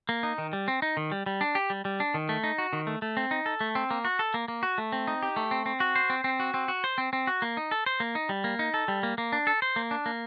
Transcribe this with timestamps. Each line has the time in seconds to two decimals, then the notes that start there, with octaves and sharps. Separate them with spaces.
0.09 A#3
0.23 D#4
0.38 D#3
0.53 G3
0.68 C4
0.82 D#4
0.97 D#3
1.11 G3
1.26 G3
1.41 D4
1.55 G4
1.70 G3
1.85 G3
2.00 D4
2.14 D#3
2.29 A3
2.44 D#4
2.58 F#4
2.73 D#3
2.87 A3
3.02 A3
3.17 C4
3.31 D#4
3.46 A4
3.61 A3
3.75 C4
3.91 A#3
4.05 F#4
4.19 A4
4.34 A#3
4.48 A#3
4.63 F#4
4.78 A3
4.92 C4
5.07 D#4
5.23 G4
5.36 A3
5.51 C4
5.66 C4
5.80 F#4
5.96 C5
6.10 C4
6.24 C4
6.40 F#4
6.54 C4
6.68 F#4
6.84 C5
6.98 C4
7.13 C4
7.27 F#4
7.42 A#3
7.57 D#4
7.71 A4
7.86 C5
8.00 A#3
8.15 D#4
8.29 G3
8.44 A#3
8.59 D#4
8.74 A4
8.88 G3
9.03 A#3
9.18 A#3
9.32 D4
9.47 A4
9.62 C5
9.76 A#3
9.91 D4
10.06 A#3